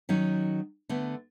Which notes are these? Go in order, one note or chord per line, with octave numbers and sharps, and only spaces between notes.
D#3 F#3 C#4 D#4
D3 A3 B3